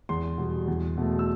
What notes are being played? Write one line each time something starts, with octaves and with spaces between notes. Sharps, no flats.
E2 C6
B2 G3
E2
B2 A3
E6